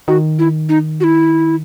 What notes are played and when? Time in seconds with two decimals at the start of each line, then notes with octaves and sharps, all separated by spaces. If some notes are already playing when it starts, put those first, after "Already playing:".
0.08 D#3 F#4
0.39 E4
0.69 D#4
1.00 F#4
1.04 E4